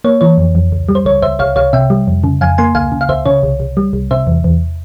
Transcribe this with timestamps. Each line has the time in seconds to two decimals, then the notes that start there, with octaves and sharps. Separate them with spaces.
0.04 A#3 C#5
0.21 E3 C#5
0.38 F2
0.55 F2
0.72 C#2
0.89 G3
0.95 C5
1.05 C#2 C#5
1.22 C#2 C5 E5
1.39 C2 C#5 F5
1.56 C2 C#5 F5
1.73 C3 E5 G5
1.90 G3
2.07 F2
2.24 C#3
2.41 F2 F5 G#5
2.58 A#3 G#5 C6
2.75 C#2 F5 G#5
2.92 C#3
3.01 F5
3.09 C#2 C5 E5
3.26 C#3 C#5
3.43 C2
3.60 C2
3.77 G3
3.93 C2
4.11 C3 C5 E5
4.27 E2
4.44 E2